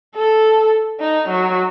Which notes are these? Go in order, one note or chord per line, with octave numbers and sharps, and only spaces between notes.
A4
D#4
F#3